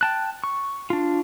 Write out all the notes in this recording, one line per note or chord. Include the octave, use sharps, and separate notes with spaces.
G5 A5 F#6
C#6
D4 F4